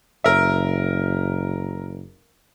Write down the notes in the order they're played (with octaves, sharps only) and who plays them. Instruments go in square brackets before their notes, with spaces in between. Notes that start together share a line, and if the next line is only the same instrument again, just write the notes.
[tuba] F#1 [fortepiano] A#4 E5